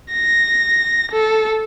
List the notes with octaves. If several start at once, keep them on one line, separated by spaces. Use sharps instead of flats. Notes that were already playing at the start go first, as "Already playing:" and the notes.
A#6
A4